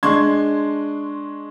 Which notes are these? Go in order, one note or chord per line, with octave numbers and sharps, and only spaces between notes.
G#3 D4 C6 C#6 G#6